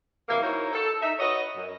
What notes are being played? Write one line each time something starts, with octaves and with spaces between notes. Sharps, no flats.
C3 E3 F#3 A#3
D#4 E4 F#4 A#4 C5 C#5
A4
D#4 E5
F#4 B4 C#5 D#5
F#2